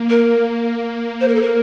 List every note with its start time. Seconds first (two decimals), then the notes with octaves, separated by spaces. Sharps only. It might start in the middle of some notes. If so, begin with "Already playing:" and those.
Already playing: A#3
0.10 A#4
1.21 C5
1.28 A#4
1.35 A4
1.42 A#4